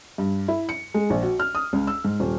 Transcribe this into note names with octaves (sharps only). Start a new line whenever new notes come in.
G2
E4
C#7
G#3
A#1
F#4
F6
D#6
C#2
E6
G#2
D#1